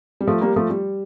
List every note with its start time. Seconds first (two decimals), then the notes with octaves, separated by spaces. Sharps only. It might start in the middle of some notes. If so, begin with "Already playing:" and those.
0.21 G3
0.27 F3 A3
0.41 G3 A#3
0.56 F3 A3
0.70 G3